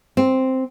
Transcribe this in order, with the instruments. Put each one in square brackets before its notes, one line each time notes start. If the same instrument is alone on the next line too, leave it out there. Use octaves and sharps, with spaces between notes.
[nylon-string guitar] C4